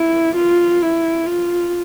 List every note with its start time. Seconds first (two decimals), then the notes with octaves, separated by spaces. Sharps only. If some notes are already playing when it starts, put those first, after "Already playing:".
Already playing: E4
0.36 F4
0.82 E4
1.27 F4